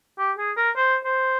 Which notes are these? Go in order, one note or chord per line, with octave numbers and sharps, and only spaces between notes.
G4
G#4
A#4
C5
C5